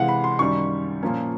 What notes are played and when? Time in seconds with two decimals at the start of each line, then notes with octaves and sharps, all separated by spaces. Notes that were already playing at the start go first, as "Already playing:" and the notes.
Already playing: C3 E3 G#3 F5 F#5
0.08 B5
0.24 C6
0.39 F#2 D#3 G3 C#6
1.03 A#2 F3 A#3 C#4